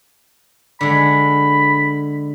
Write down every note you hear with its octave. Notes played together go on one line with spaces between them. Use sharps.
D3 G#3 B5